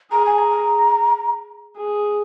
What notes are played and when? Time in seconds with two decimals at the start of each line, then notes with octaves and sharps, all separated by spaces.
0.12 G#4 A#5
0.26 G#5
0.39 A#5
1.77 G#4